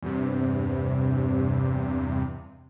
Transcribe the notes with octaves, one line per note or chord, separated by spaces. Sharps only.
E2 G2 C3